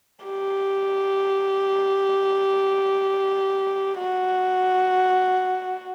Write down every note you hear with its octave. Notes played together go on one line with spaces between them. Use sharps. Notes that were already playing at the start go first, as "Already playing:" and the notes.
G4
F#4